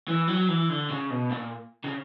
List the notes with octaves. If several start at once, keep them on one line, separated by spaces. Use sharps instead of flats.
E3
F#3
E3
D3
C#3
B2
A#2
C#3